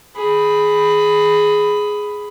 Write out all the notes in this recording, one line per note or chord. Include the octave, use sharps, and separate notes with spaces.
G#4 B5